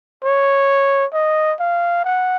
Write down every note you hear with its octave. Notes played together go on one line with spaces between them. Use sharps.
C#5
D#5
F5
F#5